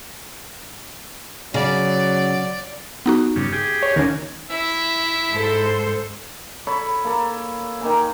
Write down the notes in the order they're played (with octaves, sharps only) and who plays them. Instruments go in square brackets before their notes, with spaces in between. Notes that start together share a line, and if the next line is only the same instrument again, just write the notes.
[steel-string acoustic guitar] C#3 [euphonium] F#3 [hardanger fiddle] D5
[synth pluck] B3 D#4 F#4
[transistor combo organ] G2 C#3
G4 G#4
[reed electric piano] C#5
[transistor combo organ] D2 A#3 G#5 [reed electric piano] D#3 C#4
[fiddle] E4 [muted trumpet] E5
[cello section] G#2 A4 C5
[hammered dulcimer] A4 C#5 B5
A#3 A4
D#3 A#3 G#5